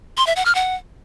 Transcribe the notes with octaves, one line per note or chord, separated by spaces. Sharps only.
C6
E5
F#5
F6
F#5